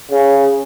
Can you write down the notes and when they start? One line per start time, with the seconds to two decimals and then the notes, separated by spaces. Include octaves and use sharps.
0.11 C#3